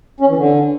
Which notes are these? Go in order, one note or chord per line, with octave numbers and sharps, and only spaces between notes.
C#4
E3
D3